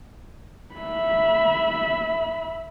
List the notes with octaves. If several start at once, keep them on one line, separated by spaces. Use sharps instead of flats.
E5 B5